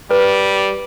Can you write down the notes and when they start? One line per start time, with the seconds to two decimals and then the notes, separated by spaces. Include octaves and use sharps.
0.11 G3 B4